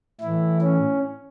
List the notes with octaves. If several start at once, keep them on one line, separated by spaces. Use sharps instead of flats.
A2 E3 E4
C#4